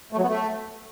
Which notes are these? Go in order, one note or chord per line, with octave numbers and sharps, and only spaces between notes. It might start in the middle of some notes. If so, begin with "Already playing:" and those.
A3
F#3
B3
A3